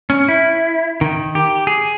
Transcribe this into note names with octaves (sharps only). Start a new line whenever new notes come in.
C#4
E4
D#3
G4
G#4